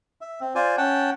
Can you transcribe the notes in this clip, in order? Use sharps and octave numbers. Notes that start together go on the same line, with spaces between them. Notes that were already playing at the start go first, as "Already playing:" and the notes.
E5
C4
F4 C5 D5 G#5
C#4 F#5 G5 A5